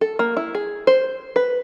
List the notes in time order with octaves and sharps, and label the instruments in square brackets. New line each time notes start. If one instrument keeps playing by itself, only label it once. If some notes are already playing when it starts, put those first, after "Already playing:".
[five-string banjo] A4
A#3
E4
G#4
C5
B4